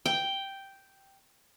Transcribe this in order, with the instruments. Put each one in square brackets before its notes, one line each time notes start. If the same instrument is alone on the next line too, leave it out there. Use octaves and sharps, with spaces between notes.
[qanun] G5